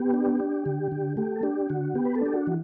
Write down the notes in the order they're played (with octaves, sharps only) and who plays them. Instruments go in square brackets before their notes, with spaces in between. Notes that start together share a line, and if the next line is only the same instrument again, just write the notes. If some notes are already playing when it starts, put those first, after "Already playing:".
Already playing: [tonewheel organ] B3 G4
D4
D4
D3
D3
A3 G4
A4
D4 G4
D3 F#4
B3 G4
B4
A4
D4 G4
F#4
E3